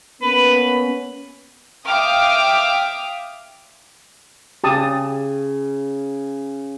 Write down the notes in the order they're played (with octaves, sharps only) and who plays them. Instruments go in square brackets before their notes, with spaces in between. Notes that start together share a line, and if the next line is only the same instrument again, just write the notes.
[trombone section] A#3 B3 C#4 [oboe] B4
[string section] E5 F5 G5 D6 D#6 F6
[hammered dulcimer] C#3 [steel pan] G4 A5 D#6